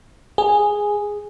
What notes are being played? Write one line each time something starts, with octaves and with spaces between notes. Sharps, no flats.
G#4